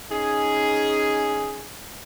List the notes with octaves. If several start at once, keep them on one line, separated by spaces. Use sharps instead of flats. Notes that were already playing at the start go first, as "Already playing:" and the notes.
C#4 D#4 G#4